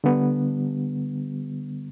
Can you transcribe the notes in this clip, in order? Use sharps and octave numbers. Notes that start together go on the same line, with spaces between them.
D3 G3 B3